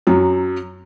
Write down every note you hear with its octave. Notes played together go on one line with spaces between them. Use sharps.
F#2 F#3